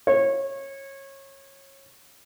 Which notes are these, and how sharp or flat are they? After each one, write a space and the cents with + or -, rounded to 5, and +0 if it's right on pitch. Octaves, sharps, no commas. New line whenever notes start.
C#5 -25